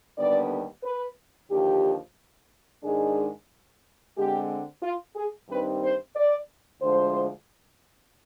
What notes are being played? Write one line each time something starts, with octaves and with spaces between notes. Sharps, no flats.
D#2 D3 G3 B3 D5
B4
D#2 D3 F3 G4
G#2 D#3 G#3 D4 G#4
D3 G#3 C4 G4
F4
G#4
G2 D#3 G3 C4 D#4 B4
C5
D5
D2 D3 F3 G#3 C5